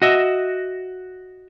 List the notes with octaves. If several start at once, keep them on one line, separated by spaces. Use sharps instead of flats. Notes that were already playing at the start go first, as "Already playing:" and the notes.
F#4 D#5 E5